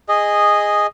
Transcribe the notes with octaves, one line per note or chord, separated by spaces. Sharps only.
G#4 D#5